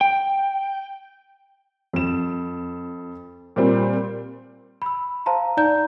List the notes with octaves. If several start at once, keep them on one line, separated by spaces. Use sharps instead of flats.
G5
F2 E7
A#2 G3 C4
B5 E6
C5 F5 A5 A#5 C6
D#4 D5 A#5 G6